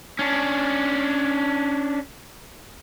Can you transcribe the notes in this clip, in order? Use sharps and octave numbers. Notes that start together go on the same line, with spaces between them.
C#4 D4